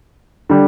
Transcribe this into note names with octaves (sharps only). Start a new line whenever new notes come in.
D3 G3